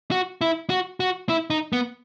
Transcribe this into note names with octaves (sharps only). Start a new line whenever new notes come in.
F#4
E4
F#4
F#4
E4
D#4
B3